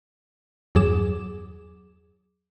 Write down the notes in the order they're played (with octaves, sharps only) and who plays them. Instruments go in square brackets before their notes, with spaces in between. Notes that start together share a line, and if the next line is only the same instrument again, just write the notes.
[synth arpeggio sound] E2 G2 F#3 G#4 D6 E7